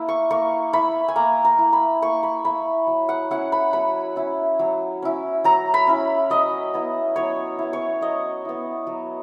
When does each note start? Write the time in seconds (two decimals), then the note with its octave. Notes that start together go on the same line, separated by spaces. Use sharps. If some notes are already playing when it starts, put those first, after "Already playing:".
Already playing: A#3 E4
0.09 C#6
0.31 A#3 C#6
0.73 E4 B5
1.08 G#5
1.16 A#3 A#5
1.45 A#5
1.58 E4
1.73 B5
2.02 A#3 C#6
2.23 B5
2.45 E4 B5
2.87 F#3
3.09 F#5
3.31 C#4 E4 F#5
3.52 B5
3.73 F#3 B5
4.16 C#4 E4
4.59 F#3
5.02 C#4 E4
5.44 F#3 A#5
5.74 B5
5.87 C#4 E4
6.30 F#3 D#5
6.74 B3 E4
7.16 F#3 C#5
7.59 B3 E4
7.73 C#5
8.01 F#3 D#5
8.45 B3 E4
8.87 F#3